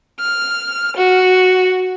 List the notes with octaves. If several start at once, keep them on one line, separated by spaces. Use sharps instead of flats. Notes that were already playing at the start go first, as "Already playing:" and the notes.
F6
F#4